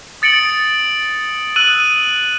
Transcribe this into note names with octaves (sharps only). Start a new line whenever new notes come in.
D#6 A6 C#7 D7 F#7
D#6 E6 F#6 D#7 F#7